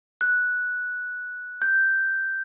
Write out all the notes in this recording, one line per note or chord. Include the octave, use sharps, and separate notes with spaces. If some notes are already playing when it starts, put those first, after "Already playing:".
F#6
G6